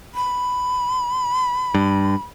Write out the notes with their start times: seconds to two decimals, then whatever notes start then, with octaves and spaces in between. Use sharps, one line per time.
0.15 B5
1.74 G2